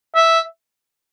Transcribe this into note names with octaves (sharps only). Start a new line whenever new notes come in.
E5